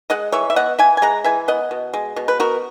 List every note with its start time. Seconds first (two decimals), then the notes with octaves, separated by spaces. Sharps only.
0.10 G#3 D#5 F#5
0.32 E3 C#5 E5
0.50 E5
0.56 B3 D#5 F#5
0.79 E3 E5 G#5
0.97 G#5
1.02 G#3 F#5 A#5
1.24 E3 E5 G#5
1.48 B3 D#5 F#5
1.71 B2
1.94 G#3
2.16 B2
2.28 B4
2.40 B3 F#4 A#4